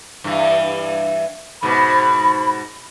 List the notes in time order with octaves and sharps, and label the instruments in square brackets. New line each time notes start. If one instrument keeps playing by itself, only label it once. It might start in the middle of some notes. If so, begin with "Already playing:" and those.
[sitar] G2 E3
[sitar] G#2 B2 [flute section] B5